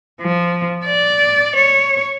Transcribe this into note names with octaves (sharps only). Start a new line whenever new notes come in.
F3
D5
C#5